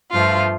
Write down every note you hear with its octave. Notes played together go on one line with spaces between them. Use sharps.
G2 F3 A3 F4